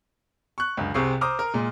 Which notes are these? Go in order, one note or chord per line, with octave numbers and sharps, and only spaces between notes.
C#6 F#6
C#2 F#2 D3
C2 C3 C4 G#4 C#6 C7
C5 A#5 D6 D#6 F6
A#4
A#2 G#3